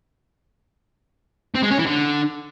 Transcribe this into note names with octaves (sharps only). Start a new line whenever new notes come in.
C4
G#3
C#4
E3
D3